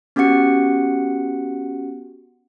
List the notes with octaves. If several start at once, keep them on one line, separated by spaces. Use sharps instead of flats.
B3 C#4 F#4 G4 F#5 C#7